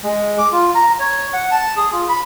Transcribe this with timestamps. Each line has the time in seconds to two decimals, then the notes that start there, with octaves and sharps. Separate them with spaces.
0.04 G#3
0.38 D6
0.52 F4
0.75 A#5
1.00 C#5
1.33 F#5
1.51 A5
1.77 G#4
1.92 F4
2.09 B5